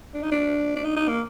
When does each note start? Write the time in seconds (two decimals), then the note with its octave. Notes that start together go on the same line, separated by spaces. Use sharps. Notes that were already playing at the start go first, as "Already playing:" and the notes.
0.14 D4
0.23 D#4
0.32 D4
0.76 D4
0.85 D#4
0.96 D#4
1.08 A#3